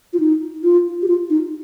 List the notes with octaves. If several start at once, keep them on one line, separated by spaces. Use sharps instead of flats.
F4
D#4
F4
G4
F4
D#4